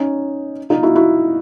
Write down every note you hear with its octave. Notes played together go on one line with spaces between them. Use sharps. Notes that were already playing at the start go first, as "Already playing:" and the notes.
Already playing: C#4 D#4
D#4 F4
E4 F#4
E4 F#4